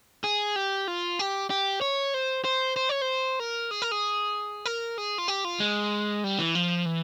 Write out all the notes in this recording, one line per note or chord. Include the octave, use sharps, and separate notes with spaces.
G#4
G4
F4
G4
G4
C#5
C5
C5
C5
C#5
C5
A#4
G#4
A#4
G#4
A#4
G#4
F4
G4
F4
G#3
G3
E3
F3
E3